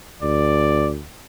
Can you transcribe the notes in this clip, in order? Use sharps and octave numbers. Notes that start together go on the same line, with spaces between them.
D2 D5